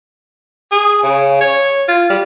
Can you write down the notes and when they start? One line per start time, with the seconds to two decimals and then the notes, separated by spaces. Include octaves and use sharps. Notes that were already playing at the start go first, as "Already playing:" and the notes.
0.72 G#4
1.03 C#3
1.41 C#5
1.88 F4
2.10 G3